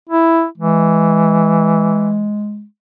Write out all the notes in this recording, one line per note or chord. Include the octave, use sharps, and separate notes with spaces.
E4
E3 G#3